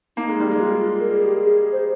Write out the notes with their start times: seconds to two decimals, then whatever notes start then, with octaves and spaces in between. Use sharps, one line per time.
0.16 A#3 D#4
0.29 G#3
0.40 G3
0.52 G#3
0.58 G4
0.62 F4
0.99 A#4
1.11 G#4
1.24 G4
1.36 G#4
1.72 C5